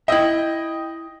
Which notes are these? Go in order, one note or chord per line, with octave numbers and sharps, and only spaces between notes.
E4 D#5 E5 G5